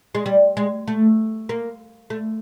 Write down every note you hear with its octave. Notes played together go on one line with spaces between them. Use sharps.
G#3
G3
G#3
A3
A#3
A3